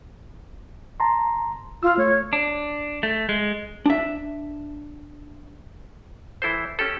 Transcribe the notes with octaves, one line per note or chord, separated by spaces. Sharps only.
A5 A#5 C6
F4 E6 F6
A3 C#5
D4
A3
G#3
D4 E5
E3 E4 A4 C5
C#4 G4 A4